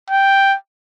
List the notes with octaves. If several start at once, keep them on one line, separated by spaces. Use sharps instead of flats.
G5